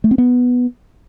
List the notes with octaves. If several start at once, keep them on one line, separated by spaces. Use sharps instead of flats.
A3
C4
B3